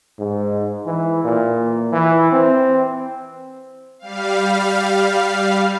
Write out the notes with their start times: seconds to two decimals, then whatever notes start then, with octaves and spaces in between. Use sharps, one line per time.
0.19 G#2
0.85 E3
1.25 A#2
1.92 E3
2.32 C4
3.99 G3 F5